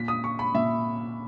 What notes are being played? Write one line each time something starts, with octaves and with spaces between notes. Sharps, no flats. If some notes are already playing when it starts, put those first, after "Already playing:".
Already playing: A#2 B6
D#6
C#6
B5
A#2 E5